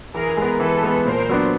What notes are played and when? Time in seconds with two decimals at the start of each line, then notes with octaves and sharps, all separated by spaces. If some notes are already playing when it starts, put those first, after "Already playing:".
0.15 E3 G#4 A#4
0.37 G#3 B3
0.60 E3 A4 B4
0.83 G#3 B3
1.05 A#2 A#4 C5
1.29 F#3 B3 D4